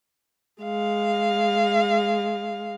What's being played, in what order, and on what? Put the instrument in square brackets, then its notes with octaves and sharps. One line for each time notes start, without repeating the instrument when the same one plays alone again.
[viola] G#3 F5